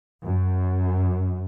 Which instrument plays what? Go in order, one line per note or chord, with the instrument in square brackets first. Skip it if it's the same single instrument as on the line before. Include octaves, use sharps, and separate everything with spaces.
[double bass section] F#2